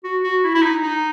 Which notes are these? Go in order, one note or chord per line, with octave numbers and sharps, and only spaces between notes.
F#4
F#4
E4
E4
D#4
D#4